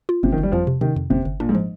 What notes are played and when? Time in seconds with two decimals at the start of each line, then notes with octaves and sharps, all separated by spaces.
0.09 F4
0.23 G1 C3
0.32 D#3
0.38 G1
0.43 G3
0.52 F2 F3
0.67 C3
0.81 C3 D#3
0.96 F2
1.10 G1 C3
1.25 G1
1.40 A#2 D4
1.49 G#2
1.55 F3